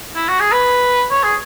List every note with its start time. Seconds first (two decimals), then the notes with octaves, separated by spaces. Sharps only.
0.16 E4
0.28 F#4
0.40 G#4
0.52 B4
1.11 C#5
1.23 G#4